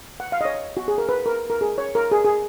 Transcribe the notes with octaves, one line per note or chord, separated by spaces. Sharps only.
F#5
F5
D#5
C#5
F#4
G#4
A#4
B4
A#4
A#4
G#4
C#5
A#4
G#4
G#4